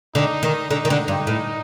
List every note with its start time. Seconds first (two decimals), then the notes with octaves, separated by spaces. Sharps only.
0.15 D3 D#4
0.43 D#3
0.71 D3 D#4
0.85 D#3
0.90 D3
1.08 G2
1.27 A2